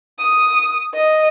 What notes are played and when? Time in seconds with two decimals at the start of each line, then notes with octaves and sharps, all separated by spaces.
0.19 D#6
0.94 D#5